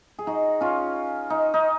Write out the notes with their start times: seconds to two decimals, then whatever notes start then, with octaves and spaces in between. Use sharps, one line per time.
0.19 G#4
0.27 D#4 F#4
0.61 C#4 F4
1.30 D#4
1.54 D#4